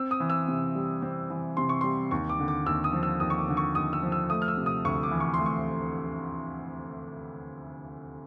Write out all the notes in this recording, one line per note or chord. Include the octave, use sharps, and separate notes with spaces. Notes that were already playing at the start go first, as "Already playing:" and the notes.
Already playing: C4 E6
D#6
E3
E6
C3
G3
C4
E3
C3 C6
C#6
G3 C6
D#2 C#6
D6
D3
D6
D#2 E6
D#6
F3
E6
D#2 D#6
C#6
D6
D3
C#6
D#2 D#6
E6
F3
E6
A3 D#6
F6
E6
C3
D#6
D2 C#6
D6
E3
C#6
C6
A3
C#6